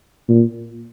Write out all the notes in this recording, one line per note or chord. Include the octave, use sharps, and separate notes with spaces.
A#2